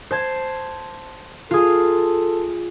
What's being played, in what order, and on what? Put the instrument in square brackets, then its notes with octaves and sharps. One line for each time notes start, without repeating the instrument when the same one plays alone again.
[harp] C5 A5 G#6
[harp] F4 G#4 [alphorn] A4